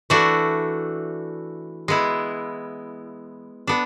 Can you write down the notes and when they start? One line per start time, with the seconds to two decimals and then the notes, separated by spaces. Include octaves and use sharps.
0.10 E3 A3 D4 F#4
1.88 G#3 B3 E4
3.67 B3 D4